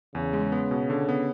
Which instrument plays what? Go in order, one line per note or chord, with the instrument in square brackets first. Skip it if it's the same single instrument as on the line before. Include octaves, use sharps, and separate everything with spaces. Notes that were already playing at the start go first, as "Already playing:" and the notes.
[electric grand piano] E2 [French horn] C#3
[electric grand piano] G#3
B3
B2
D3
B3